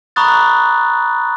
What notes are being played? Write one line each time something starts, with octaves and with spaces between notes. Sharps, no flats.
A#5 B5 C#6 D#6 F#6 A6